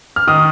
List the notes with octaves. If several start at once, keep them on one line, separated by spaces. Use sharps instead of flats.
F6
D#3 D#6